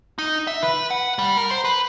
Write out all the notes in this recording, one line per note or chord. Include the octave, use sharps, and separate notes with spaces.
D#4
E5
B4
F#5
G3
A#4
C5
B4